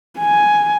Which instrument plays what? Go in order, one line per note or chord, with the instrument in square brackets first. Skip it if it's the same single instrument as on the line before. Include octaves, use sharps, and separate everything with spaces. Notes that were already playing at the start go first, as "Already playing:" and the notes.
[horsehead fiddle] G#5